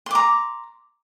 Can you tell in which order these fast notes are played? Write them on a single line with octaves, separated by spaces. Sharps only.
C6 D6 A#5